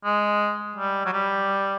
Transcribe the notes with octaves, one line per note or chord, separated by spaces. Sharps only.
G#3
G3
F#3
G3